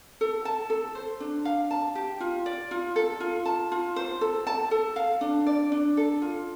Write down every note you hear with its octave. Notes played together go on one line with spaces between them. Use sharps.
A4
A5
A4
C5
D4
F5
A5
G4
F4
D5
F4
A4
F4
A5
F4
C5
A4
A5
A4
F5
D4
D5
D4
A4
F4